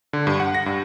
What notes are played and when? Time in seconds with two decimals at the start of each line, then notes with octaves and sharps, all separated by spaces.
0.13 D3
0.27 G2
0.40 F#5
0.55 A#6
0.66 G2